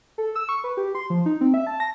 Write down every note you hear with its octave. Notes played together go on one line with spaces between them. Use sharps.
A4
E6
C#6
B4
G4
C6
F3
D#4
C4
E5
A5
A#6